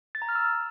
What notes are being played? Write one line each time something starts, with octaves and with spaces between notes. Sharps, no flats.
A6
A#5
F6
E6